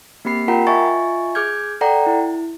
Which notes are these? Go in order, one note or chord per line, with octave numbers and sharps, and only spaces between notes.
A#3 C4 G4 B5 C7
F4 A#4 F#5 G5 A#5 B5
F4 D#5 E5 G#5 C#6 A6
G#4 D6 F6 G6 G#6
A4 D5 F#5 G5 A#5
E4